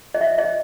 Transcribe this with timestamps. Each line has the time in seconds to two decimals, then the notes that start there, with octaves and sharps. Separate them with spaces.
0.15 D#5
0.21 E5
0.38 D#5